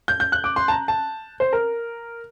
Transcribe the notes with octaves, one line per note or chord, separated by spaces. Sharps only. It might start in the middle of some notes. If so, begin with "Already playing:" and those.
G6
G6
F#6
D6
C6
A5
A#5
A5
C5
A#4